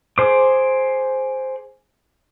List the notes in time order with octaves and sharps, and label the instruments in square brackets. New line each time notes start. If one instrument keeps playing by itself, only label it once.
[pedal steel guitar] G#4 C5 D6